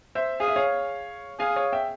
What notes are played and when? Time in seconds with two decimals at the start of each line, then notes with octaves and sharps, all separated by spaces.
0.15 C5 E5
0.40 G#4 F5
0.48 E5
0.56 C#5 F5
1.39 G#4 F5 G#5
1.56 C#5 F5
1.73 E5 G5